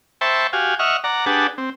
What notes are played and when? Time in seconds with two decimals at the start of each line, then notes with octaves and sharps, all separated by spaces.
0.21 C5 E5 G5 A5 B5 C#6
0.53 F#4 G4 F5 G#5
0.79 D#5 E5 F#5 C#6 F6
1.04 D5 F#5 A#5
1.26 D4 G4 G#4 B4 F#5 A5
1.58 C4